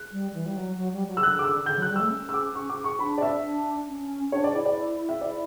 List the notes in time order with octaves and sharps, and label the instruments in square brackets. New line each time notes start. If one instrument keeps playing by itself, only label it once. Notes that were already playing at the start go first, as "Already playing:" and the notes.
Already playing: [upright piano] F#6
[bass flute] G3
E3
G3
F#3
F#3
G3
F#3
[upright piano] E6
[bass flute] D3 [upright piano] F#6
[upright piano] D6
E6
[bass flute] D3 [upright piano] G6
[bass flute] F#3
[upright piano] F#6
[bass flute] G3
[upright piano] E6
[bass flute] A3
C#4
[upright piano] E6
D6
C#6
D6
C#6
[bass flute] D4 [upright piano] B5
[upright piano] D5
E5
[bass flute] D4
C#4
[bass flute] D4 [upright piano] C#5
[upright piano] D5
[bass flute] E4 [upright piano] D5
[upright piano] D5
E5
[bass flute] E4 [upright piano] D5